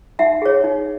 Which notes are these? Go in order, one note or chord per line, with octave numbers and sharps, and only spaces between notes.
D#4 E5 F#5
G#4 C#5
D#4